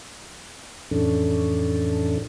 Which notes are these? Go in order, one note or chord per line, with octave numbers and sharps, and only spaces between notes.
F2 A2 E3 C#4 D4 A4